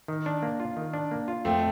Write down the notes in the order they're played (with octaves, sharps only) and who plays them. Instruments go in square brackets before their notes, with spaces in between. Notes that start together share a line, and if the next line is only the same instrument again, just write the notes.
[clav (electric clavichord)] D#3
D4
A#3
F4
D#3
D4
A#3
F4
[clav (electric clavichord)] F2 [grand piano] A3 C4